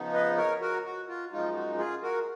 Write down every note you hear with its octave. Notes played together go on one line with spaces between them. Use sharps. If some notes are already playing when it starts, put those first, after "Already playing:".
Already playing: C#3 F3 B3 D#4
B4 D#5
A#4 C#5
F#4 A#4
F#4
F4
F#2 F3 G#3 D#4 F4
F#4
F4 G#4
F#4 A#4